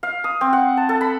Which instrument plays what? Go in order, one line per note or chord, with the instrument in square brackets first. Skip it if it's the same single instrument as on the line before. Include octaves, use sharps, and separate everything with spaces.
[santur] F5
D#6
C4
F#5
A5
A4
B5